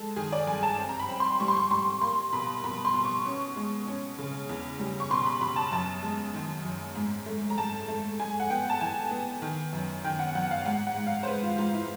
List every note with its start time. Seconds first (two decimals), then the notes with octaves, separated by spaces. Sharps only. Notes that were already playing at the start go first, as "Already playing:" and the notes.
Already playing: G#3 A4
0.16 D#3 G#4
0.32 D5
0.47 G2 G#5
0.63 A5
0.78 C4
0.89 A#5
1.00 B5
1.09 C4
1.20 C6
1.40 G3 C#6
1.48 C6
1.57 C#6
1.70 G3 C6
2.01 A#3 C6
2.33 B2 B5
2.64 B2 B5
2.85 C6
2.94 B2
3.05 C#6
3.25 C#4 C#6
3.56 G#3
3.87 C#4
4.19 C#3
4.49 E2
4.79 G3
5.00 C#6
5.10 B2 C6
5.26 B5
5.41 B2 B5
5.56 A5
5.72 F#2 A5
6.03 G#3
6.34 D#3
6.64 F#2
6.95 G#2
7.26 A3
7.50 A#5
7.58 G#2 A5
7.88 A3
8.20 G#3 G#5
8.40 F#5
8.50 B3 G5
8.70 A5
8.81 E3 G#5
9.11 B3
9.42 D#3
9.73 F#2
10.04 D#3 G5
10.19 F#5
10.35 F#2 F#5
10.51 F5
10.66 G#2 F#5
10.87 F#5
10.96 G#2
11.07 F5
11.23 C5
11.27 G#3 B4
11.43 F4
11.58 G#2 F4
11.74 E4